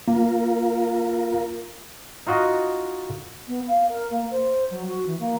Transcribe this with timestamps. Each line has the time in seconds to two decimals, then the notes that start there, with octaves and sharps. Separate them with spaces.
0.08 A#3 F4 A#4
2.27 D#4 F4 F#4 D#5
3.48 B3
3.68 F5
3.89 A#4
4.11 A#3
4.31 C5
4.71 F#3
4.88 F#4
5.07 E3
5.20 A#3